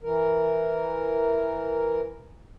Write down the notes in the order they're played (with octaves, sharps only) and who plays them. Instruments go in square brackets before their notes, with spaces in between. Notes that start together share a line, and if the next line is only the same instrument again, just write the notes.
[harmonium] E3 A#4